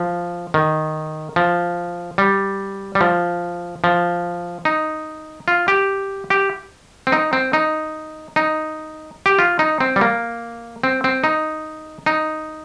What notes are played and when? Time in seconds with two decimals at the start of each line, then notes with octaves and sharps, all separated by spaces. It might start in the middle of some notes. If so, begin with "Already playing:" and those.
Already playing: F3
0.54 D#3
1.36 F3
2.18 G3
2.95 G3
3.01 F3
3.84 F3
4.65 D#4
5.48 F4
5.68 G4
6.30 G4
7.07 C4
7.12 D#4
7.33 C4
7.53 D#4
8.36 D#4
9.26 G4
9.39 F4
9.59 D#4
9.80 C4
9.96 G3
10.01 A#3
10.84 C4
11.04 C4
11.24 D#4
12.06 D#4